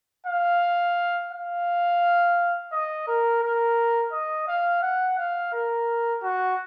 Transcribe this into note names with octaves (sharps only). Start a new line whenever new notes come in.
F5
F5
D#5
A#4
A#4
D#5
F5
F#5
F5
A#4
F#4